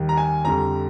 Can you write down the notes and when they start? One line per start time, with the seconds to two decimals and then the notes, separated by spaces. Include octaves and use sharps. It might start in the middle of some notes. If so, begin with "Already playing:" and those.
Already playing: D#2 D#3 G3
0.09 A#5
0.17 G#5
0.45 F2 D3 G3 A#5